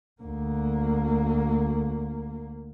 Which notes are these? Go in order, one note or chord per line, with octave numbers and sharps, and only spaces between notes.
D2 A#3